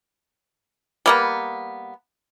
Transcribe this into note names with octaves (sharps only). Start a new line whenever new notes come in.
G3 A#3 B3